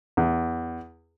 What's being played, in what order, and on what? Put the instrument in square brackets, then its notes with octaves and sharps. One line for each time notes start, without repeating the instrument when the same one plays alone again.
[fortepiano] E2